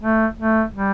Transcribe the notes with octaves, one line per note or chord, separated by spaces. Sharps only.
A3
A3
G3